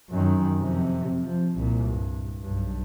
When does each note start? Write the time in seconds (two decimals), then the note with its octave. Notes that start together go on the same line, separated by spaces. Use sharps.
0.10 F#2 D#3
0.58 F2 C3
1.19 F3
1.56 C2 A#2
1.86 G2
2.43 B1 G2